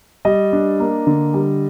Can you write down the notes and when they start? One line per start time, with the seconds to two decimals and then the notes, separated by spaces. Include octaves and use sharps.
0.25 G3 D#5
0.53 D4
0.80 A#3
1.07 D3
1.34 G3